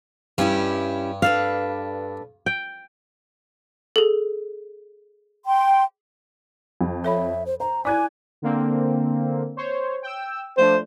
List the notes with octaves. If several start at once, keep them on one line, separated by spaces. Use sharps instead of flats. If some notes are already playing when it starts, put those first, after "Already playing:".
G2 G3 C#4 E4
D4 A4 B4 F5
G5
G#4 A4
G5 C6
F2
A4 C#5 E5 B5
C5
C5 A#5
E4 D5 G#5 D6 F#6 G#6
D3 A#3 C4
C5 C#5
G5 E6
F3 A3 D4 C5